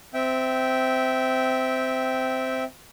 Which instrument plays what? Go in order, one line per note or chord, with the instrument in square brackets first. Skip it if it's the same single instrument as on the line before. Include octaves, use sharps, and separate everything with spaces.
[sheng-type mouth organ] C4 E5 G5